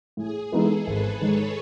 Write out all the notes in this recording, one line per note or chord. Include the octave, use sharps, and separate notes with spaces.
A2 G#4
E3 G#3 B3 D#4 A4
G#1 B4
G#2 D#3 C#5